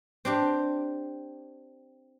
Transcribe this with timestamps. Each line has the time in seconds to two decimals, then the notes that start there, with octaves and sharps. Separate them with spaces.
0.25 C4 D4 G4